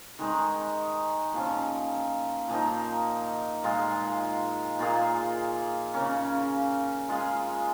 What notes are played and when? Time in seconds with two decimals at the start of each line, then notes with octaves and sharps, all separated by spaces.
0.19 D#3 G#3 D#4
1.33 A#2 F3 C#4
2.49 A#2 F3 A#3 D#4
3.64 A#2 G#3 F4
4.79 A#2 A#3 F4 G#4
5.94 C#3 A#3 C#4
7.08 G#3 F4 G#4